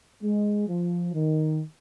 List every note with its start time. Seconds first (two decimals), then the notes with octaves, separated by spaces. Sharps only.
0.22 G#3
0.68 F3
1.13 D#3